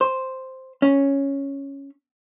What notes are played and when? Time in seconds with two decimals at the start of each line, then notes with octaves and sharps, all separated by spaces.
0.01 C5
0.82 C#4